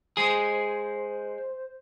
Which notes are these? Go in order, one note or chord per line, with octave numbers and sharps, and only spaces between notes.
G#3 G#4 C5